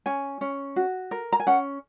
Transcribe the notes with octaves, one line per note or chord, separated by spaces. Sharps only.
C#4 G#5
C#4
F#4
A#4
A#5
G#5
C#4 F#5